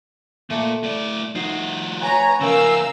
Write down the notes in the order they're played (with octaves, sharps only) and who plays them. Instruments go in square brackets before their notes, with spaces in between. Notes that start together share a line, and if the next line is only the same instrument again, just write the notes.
[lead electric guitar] A#2 [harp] A3 C#7
[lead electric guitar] A2 D5
[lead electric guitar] F3 F#4 [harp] D#4 C7
[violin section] B4 C#5 A#5 [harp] F#5 G#5
[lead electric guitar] C#3 F3 [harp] C#4 G#5 D7 [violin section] A#4 F5 E6